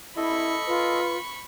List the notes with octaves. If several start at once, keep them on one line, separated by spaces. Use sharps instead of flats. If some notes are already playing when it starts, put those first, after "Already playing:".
E4 A4 D#5 B5 C#6
F4 B4